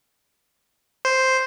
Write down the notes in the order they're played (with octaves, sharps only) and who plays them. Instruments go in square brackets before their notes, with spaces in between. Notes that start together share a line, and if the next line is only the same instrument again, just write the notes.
[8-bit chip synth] C5